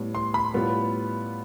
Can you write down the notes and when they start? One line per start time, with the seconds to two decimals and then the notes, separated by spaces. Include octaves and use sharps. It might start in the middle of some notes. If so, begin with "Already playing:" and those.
Already playing: A2 G3 B3
0.15 C6
0.34 B5
0.54 A2 G3 B3 F4